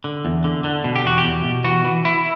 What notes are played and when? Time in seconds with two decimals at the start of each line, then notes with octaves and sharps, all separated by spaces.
0.04 D3
0.25 E2
0.44 D3
0.64 D3
0.84 B2
0.96 G4
1.04 E2 F#4
1.18 G4
1.24 E2
1.44 B2
1.64 E3 F#4
1.85 E3
2.05 E3 E4